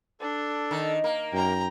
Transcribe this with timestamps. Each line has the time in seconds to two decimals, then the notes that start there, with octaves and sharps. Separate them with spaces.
0.21 D4 A4 D5
0.71 D#3
1.04 A#3 A#4
1.33 F#2 G5 A#5